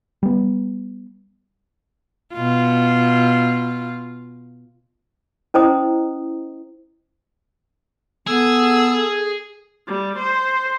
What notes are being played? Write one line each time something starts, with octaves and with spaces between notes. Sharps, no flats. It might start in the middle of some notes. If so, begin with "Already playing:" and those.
G3 B3
B2 F4
C#4 E4 C5 D#5 A#5 D#6
B3 G#4 A4 E6
G3
C5